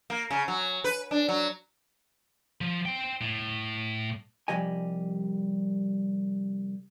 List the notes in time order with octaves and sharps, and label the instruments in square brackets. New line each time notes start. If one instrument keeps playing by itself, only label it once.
[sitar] A#3
C#3
F#3
B4
D4
F#3
[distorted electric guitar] F3
C5 G5
A2
[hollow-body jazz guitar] C2 G2 F3 G3 D#5 G#5